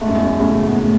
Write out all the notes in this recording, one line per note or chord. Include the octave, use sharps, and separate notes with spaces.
G#2 A3
F#2
E2
F#2
A2 C#3
B3
A3